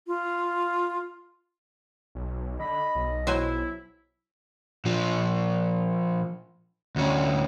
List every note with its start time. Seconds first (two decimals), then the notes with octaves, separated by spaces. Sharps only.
0.07 F4
2.15 B1
2.59 D3 D#5 B5
2.95 B1
3.27 F#3 E4 C5 G#5
4.85 A#2 F3
6.96 D2 C#4